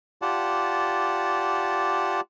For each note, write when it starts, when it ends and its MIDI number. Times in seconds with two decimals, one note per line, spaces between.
0.22 2.21 65
0.22 2.21 67
0.22 2.21 74
0.22 2.21 78
0.22 2.21 81